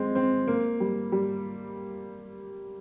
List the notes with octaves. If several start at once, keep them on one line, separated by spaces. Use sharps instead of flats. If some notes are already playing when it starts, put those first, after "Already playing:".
Already playing: G#3 C4
C4
A#3
G3
G3